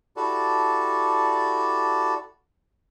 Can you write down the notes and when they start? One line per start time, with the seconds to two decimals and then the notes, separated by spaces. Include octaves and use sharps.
0.17 E4 F#4 G4 A4 D5 A5